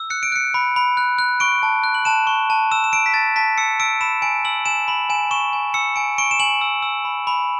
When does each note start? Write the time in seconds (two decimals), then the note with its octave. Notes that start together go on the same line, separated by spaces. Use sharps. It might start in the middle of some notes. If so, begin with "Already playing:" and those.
Already playing: E6
0.10 F#6 C#7
0.23 D7
0.32 F#6 C#7
0.54 B5
0.76 B5
0.97 F#6
1.19 F#6
1.40 C#6 D7
1.63 A5
1.84 F#6
1.94 F#7
2.05 A5 E7
2.27 C#6
2.50 A5
2.72 E6 E7
2.84 E7
2.92 E6 D7
3.06 B6
3.14 A5 A6
3.36 A5 B6
3.58 E6 C#7
3.80 E6 D7
4.01 B5 E7
4.22 G#5 D7
4.45 E6 F#7
4.66 G#5 E7
4.88 B5 F#7
5.10 G#5 E7
5.31 C#6 E7
5.53 G#5
5.74 E6 C#7
5.96 G#5 D7
6.18 C#6 D7
6.31 E7
6.40 G#5 F#7
6.61 E6
6.82 E6
7.05 B5
7.27 B5